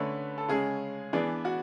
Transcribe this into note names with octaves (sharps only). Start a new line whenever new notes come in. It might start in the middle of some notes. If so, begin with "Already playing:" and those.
Already playing: D3 A3 C#4 B4
A4
C#3 G#3 C#4 G#4
E3 B3 D4 G#4
F#4